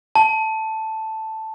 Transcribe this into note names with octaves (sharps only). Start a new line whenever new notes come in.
A5